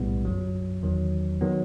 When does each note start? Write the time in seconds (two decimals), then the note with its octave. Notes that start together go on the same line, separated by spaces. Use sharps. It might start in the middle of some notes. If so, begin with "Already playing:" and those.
Already playing: B1 A2 G3 B3
0.25 G1 F#2 F#3
0.83 E2 D#3 F#3
1.41 D#3 F#3 B3